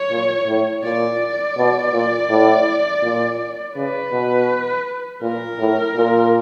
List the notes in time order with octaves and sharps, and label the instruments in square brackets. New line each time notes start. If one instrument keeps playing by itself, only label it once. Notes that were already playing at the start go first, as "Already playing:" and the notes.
Already playing: [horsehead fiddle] C#5
[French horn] A#2
A2
[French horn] A#2 [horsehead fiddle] D5
[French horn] B2
A#2
A2
A#2
[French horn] C#3 [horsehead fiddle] B4
[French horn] B2
[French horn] A#2 [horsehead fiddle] A#4
[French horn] A2
A#2